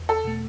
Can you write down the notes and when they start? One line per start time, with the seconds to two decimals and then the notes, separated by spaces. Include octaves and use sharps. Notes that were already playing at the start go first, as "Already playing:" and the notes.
Already playing: E2
0.09 A4
0.24 B2 A3